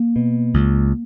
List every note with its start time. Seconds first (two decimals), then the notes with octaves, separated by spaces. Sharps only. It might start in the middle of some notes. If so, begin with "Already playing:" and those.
Already playing: A#3
0.16 B2
0.54 C#2